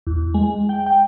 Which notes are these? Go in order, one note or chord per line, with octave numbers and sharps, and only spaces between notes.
E2
G#3
G5
G5